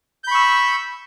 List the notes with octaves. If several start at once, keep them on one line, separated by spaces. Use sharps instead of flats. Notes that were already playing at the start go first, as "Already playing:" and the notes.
B5 C#6 E6 G6